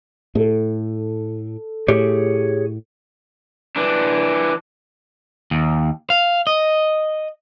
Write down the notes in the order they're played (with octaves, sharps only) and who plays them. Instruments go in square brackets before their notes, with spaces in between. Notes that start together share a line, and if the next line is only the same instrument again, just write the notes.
[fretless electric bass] A2 [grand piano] A4
[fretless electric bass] A2 [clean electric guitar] G4 G#4 C#5
[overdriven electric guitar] E3 D4
[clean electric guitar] D#2
F5
D#5